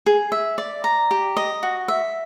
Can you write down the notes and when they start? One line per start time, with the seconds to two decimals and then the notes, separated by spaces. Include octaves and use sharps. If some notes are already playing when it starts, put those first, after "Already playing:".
0.06 G#4
0.32 E5
0.58 D5
0.84 A#5
1.11 G4
1.37 D#5
1.63 F#4
1.88 E5